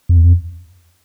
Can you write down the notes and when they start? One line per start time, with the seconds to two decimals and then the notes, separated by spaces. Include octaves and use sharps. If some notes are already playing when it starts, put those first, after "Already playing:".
0.09 F2
0.17 E2
0.24 F2